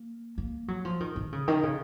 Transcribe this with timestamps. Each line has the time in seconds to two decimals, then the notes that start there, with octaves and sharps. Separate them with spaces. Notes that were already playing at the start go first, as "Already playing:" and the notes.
Already playing: A#3
0.38 A#3
0.68 F#3
0.85 F3
1.00 D#3
1.16 D#3
1.32 C#3
1.48 D#3
1.63 C#3